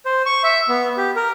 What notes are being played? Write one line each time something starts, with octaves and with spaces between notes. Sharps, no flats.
C5
C#6
E5
B3
G4
A#4